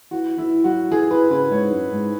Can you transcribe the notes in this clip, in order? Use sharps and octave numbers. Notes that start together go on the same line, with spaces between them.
E3 F#4
E3 E4
F#3 F#4
E3 G#4
E3 B4
C#3 B4
G#2 C#5
F#2
G#2